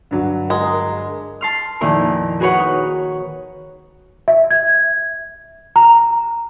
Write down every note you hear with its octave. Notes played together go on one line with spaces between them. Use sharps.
G2 D3 F#3
G#3 A#4
A5 C6 F6
F2 A#2 D#3 A#3 E4 A#5
F#4 G#4 A#4 B4 C#5 F#5
D#4
E5
G#6
A#5